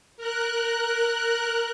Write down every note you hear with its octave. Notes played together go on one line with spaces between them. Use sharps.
A#4 F#6